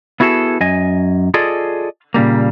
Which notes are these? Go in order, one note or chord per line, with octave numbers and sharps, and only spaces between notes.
B3 E4 F#4 G#4 A4
F#2 D#5 G#5
F4 G#4 A4 D5 D#5
A#2 C#3 G3 A#3